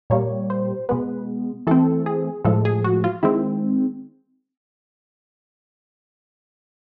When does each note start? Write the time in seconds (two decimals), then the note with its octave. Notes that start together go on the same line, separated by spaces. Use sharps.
0.10 A#2 G3 A#3 C#5
0.50 C5
0.89 B2 G#3 B3 B4
1.67 E3 A3 C4 A4
2.06 G#4
2.45 A2 F3 G#3 A4
2.65 G#4
2.84 F#4
3.04 F4
3.23 D#3 G#3 C4 E4